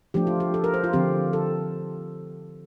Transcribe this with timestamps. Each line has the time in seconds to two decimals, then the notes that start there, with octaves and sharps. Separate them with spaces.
0.14 F3 A3 D4 G4
0.27 F4
0.40 G4
0.54 A4
0.64 A#4
0.74 C5
0.84 F4
0.93 D3 F3 C4 G4
1.33 A4